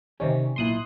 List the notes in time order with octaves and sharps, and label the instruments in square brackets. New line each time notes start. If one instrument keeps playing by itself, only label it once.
[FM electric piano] C3 D#3 C#4 [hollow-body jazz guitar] G4 C#5 D5
[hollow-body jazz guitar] B1 A#2 E4 [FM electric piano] C6 D#6 F#6